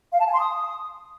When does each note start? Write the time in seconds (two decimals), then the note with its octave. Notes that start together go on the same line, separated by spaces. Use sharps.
0.13 F5
0.20 A5
0.27 G#5
0.33 C6
0.40 D#6